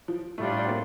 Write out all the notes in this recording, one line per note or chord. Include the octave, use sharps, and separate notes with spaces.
F3
A2 G3 A3 D4 F4
C4
A#3